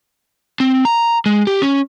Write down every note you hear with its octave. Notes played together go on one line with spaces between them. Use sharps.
C4
A#5
G#3
G4
C#4